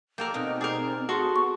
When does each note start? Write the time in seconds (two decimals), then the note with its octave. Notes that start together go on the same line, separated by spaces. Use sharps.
0.18 A#3 A4 A#4 D5 G5
0.34 B2 C4 D#4 A#5
0.61 G#4 A#4 C5 D5
1.09 F#4 G#4 A4 C6
1.36 B3 C#6